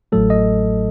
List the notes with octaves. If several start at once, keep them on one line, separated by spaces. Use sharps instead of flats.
A1 A2 F#3 A3 A4
D#5